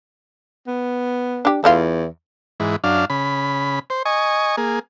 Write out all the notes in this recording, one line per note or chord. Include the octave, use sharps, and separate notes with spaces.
B3
D4 G4
E2 A3 E4 F4
G#2 E3
F#2 D4 F5
C#3 B5
C5
D#5 G#5 C#6
A#3 G#4